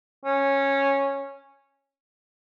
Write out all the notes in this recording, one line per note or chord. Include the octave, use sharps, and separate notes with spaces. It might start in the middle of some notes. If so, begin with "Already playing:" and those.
C#4